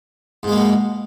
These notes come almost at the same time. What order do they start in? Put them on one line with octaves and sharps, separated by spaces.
G#2 G#3 A#3 B2